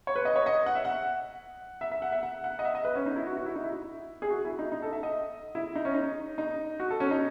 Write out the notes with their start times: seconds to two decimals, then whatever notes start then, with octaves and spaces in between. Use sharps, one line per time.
0.07 C#5
0.16 B4
0.25 D#5
0.36 C#5
0.46 D#5
0.66 F#5
0.75 E5
0.85 F#5
1.81 E5
1.92 E5
2.02 F#5
2.12 E5
2.23 F#5
2.44 F#5
2.59 D#5
2.65 E5
2.75 D#5
2.85 B4
2.95 C#4
3.06 D#4
3.16 E4
3.27 F#4
3.37 F#4
3.46 E4
3.56 D#4
3.64 E4
4.22 G#4
4.30 F#4
4.45 E4
4.59 D#4
4.72 D#4
4.82 A4
4.93 E5
5.03 D#5
5.55 E4
5.75 D#4
5.85 C#4
5.94 D#4
6.38 D#4
6.80 F#4
6.90 A4
7.00 C#4
7.11 D#4